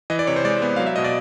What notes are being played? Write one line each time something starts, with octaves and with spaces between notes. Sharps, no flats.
E3 D#5
D5
C3 C#5
C5
G#3 D5
B3
F#3 F5
E5
B2 D#5
D5